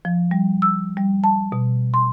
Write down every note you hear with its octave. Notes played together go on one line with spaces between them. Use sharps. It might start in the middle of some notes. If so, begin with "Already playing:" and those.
F3
G3
E6
G3
A5
B2
C6